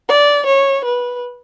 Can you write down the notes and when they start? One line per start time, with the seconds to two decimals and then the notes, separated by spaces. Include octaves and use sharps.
0.09 D5
0.46 C#5
0.85 B4